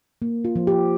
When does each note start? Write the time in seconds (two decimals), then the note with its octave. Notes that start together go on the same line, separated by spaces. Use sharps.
0.22 A#3
0.45 F4
0.56 F3
0.67 G4